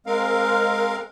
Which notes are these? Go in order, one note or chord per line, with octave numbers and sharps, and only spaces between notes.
G#3 C4 A#4 F5